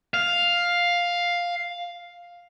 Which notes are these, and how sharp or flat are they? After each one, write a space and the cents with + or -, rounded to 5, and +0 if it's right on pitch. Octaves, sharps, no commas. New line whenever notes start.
F5 +5